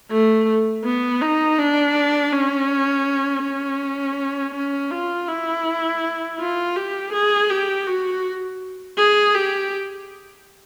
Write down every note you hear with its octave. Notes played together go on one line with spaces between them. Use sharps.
A3
B3
D#4
D4
C#4
C#4
C#4
F4
E4
F4
G4
G#4
G4
F#4
G#4
G4